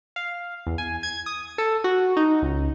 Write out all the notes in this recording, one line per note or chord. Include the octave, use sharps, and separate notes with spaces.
F5
E2
G#5
G#6
D#6
A4
F#4
D#4
C#2